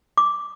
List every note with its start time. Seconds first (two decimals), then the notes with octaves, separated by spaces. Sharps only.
0.17 D6